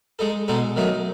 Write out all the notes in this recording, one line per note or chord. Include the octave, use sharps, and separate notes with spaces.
G#3 D#4 A4
B2 G#3 D#4 A4
D#3 F#3 A3 D#4